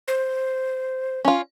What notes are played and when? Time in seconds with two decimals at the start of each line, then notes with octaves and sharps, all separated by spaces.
0.08 C5
1.25 C#4 F4